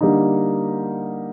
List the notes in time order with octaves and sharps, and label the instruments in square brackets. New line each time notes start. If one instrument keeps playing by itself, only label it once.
[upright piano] D3 G3 A#3 D#4